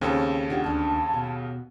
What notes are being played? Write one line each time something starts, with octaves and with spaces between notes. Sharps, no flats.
D#2 C#3 C4 A4 C#5
D4 F4 G4 F#5
D2 D4 A5
B2